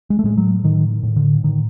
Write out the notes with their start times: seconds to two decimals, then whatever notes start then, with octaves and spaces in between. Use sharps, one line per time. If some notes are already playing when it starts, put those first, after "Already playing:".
0.10 G#3
0.19 A3
0.24 A2 G#3
0.37 F#3
0.64 A2 D#3
1.03 A2
1.16 D3
1.44 A2 D#3